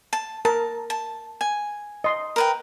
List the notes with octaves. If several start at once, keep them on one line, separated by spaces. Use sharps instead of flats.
A5
A#4 A5
A5
G#5
D#5 C6
A#4 B4 G5